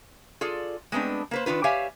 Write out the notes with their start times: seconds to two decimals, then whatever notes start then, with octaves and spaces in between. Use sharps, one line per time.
0.41 F4 G#4 A4 D5
0.92 G#3 A3 B3 C4 D4
1.31 A#3 B4 C5
1.46 D#3 D4 F4 B4
1.64 G4 C#5 D5 E5 F5 G#5